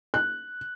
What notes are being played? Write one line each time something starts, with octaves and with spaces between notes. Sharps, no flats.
F#6